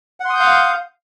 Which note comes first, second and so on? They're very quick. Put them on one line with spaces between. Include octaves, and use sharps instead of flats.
F#5 C6 D#6 G6 F5